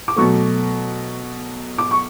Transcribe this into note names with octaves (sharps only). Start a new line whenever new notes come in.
D6
B2 F#3 A3 C#6
D6
C#6